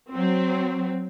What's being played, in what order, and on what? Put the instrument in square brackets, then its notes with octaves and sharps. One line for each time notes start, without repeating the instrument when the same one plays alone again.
[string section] F#3 C4